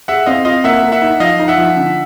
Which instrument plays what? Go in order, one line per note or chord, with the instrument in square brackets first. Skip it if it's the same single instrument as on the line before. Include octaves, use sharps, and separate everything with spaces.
[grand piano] G#4 [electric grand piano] E5 F#5
[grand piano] C4 [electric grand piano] D#5 F5
[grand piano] F4 [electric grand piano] D#5 F5
[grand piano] A#3 [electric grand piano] E5 F#5
[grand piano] A#3
[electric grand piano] E5 F#5
[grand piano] D#4
[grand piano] F3 [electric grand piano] D#5 F5
[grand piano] D#4
[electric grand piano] E5 F#5
[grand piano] F3
D3